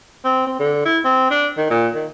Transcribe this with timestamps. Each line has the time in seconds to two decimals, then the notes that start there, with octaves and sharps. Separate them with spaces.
0.25 C4
0.47 C4
0.60 D3
0.86 E4
1.05 C4
1.31 D4
1.57 D#3
1.70 A#2
1.95 D#3